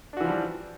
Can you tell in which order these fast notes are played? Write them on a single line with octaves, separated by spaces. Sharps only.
D4 F#4 E3 F3 G3